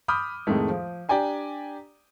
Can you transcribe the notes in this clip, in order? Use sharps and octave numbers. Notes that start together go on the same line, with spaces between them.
B5 D6 D#6 F6 G6
F2 A2 D#3 G#3 A3
F3
D4 G4 D5 G5 G#5 A#5